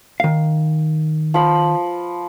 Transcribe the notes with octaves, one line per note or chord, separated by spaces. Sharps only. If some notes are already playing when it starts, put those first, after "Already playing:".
D#3 F5
F3 B5